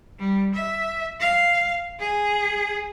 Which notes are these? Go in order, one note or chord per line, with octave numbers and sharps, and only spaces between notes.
G3
E5
F5
G#4